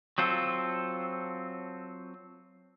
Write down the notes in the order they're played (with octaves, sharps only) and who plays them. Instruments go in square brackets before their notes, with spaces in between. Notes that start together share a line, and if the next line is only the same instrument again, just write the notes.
[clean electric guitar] F#3 C4 F4 A4